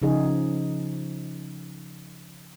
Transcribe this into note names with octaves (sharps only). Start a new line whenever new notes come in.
C#3 F3 D#4 G#4